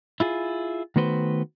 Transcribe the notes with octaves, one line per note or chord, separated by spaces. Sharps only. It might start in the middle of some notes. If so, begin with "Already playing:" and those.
E4 F4 G#4
D#3 A3 B3 F#4 B4 C5